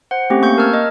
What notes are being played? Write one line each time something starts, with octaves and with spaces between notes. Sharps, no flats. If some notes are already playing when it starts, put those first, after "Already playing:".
C5 F#5
A3 C4 C#4 G4
A#3 C#6 G6
A#4 A5 E6 F6 G#6
D#5